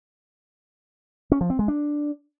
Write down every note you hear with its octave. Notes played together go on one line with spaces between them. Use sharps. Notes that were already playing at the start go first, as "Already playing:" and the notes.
C#4
F3
C4
G#3
D4